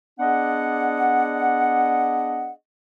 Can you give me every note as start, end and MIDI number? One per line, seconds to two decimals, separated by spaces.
0.20 2.51 59
0.20 2.51 62
0.20 2.51 68
0.20 2.51 74
0.20 2.51 75
0.20 2.51 78